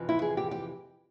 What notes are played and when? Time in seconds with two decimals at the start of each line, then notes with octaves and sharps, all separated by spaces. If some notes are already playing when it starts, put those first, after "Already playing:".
Already playing: F2 C3 E3
0.09 E4
0.22 G#4
0.37 G4
0.51 G4